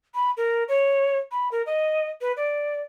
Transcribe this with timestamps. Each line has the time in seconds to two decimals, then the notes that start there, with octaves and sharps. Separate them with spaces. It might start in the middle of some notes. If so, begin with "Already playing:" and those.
0.14 B5
0.37 A#4
0.69 C#5
1.31 B5
1.52 A#4
1.66 D#5
2.21 B4
2.37 D5